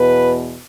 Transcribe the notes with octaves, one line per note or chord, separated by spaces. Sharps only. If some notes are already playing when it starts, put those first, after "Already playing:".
Already playing: E2 B2 B4